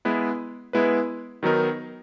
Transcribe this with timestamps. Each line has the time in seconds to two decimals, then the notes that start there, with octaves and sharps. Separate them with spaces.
0.05 G#3 B3 E4 B4
0.73 G#3 B3 E4 B4
1.43 D#3 F#3 B3 D#4 A#4